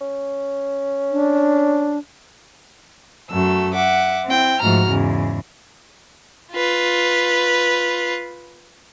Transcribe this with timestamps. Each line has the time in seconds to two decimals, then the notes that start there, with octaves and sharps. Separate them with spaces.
0.01 C#4
1.11 D4
3.31 F#2 F#3 A3 E6
3.74 E5 F#5 D6
4.26 C4 E4 G5
4.61 G#2 F3 A3 F#4 A#5 F6
4.90 E2 G#2 C#3
6.53 F4 B4